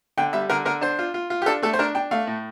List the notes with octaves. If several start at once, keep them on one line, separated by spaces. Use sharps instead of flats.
D3 G5
G3 E5
D3 A#4
D3 A#4
D4 C5
F4
F4
F4
G4
D4 A4
A3 A4
C5
D4 A#4
D4 G5
A3 F5
A2